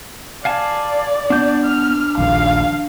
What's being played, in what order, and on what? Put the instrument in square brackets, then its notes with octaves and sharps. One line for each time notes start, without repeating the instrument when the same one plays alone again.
[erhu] D5 [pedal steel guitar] F5 G#5 A5
[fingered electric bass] B3 [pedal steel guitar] D4 G6
[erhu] F6
[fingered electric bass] D#1 A#1 D#2 [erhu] F5